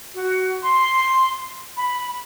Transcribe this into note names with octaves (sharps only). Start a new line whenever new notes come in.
F#4
C6
B5